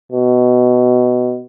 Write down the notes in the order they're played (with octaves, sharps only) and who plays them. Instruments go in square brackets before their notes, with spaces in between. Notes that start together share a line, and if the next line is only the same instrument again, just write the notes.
[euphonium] B2